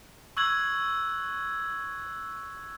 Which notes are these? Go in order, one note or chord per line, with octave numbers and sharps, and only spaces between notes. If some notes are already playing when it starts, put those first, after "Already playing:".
C#6 E6 F#6 G#6 F#7